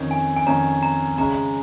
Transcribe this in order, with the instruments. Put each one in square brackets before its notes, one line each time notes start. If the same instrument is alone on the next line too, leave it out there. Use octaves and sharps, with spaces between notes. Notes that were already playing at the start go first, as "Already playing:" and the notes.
Already playing: [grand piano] F2 D#3 C#4
[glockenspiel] G#5
G#5
[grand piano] F2 D#3 C#4 [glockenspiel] A#5
[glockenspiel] A#5
[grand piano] C#3 G#3 C#4 [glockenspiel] A#5